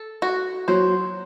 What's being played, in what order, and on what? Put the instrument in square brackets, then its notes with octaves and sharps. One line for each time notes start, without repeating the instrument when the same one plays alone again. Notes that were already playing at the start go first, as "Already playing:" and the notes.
Already playing: [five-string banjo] A4
F#4
[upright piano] F#3 [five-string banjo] C5